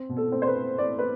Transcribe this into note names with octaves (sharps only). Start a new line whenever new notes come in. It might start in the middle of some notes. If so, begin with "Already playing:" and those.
Already playing: C4
B2
A4
C4
C5
B4
A3
C4 D5
B4